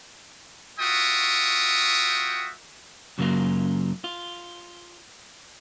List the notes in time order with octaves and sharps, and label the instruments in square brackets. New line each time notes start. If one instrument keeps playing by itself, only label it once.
[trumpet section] F4 F#4 E5 G5 C#6 D#6
[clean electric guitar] F#2 C#3 F#3 A3 A#3 F4
F4